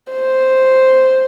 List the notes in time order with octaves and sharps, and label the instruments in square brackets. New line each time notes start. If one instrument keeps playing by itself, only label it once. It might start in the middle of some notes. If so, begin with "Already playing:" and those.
[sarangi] C5